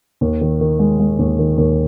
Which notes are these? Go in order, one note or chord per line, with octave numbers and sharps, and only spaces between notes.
D#2
D#3
D#3
G#3
G#3
D#2
D#3
D#2